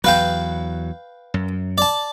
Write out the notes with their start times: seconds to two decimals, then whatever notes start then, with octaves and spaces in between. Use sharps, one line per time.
0.04 E2 F#3 B4 F5 G5
1.34 F#2
1.78 D5 A5